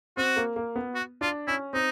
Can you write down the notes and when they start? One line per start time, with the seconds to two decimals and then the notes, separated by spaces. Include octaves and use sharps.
0.17 C4 F#4
0.37 A#3
0.56 A#3
0.76 B3
0.95 F#4
1.21 D4 F4
1.47 C#4 E4
1.73 C4 D#4